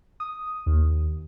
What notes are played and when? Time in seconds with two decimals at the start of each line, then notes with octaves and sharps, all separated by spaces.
0.20 D#6
0.66 D#2